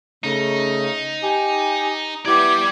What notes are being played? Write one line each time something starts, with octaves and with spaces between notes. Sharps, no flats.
C#3 A3 D#4
G4 G#5
G3 B3 E4 G4 D5 G#6